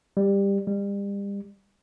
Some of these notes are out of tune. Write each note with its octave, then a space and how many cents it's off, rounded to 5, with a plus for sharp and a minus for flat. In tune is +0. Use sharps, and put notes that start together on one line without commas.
G3 +15
G3 +35